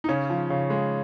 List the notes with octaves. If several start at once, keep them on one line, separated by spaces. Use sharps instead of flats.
D#4
C#3 C#4
F3
C#3
G#3